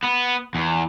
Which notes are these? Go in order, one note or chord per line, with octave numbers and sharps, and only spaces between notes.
B3
E2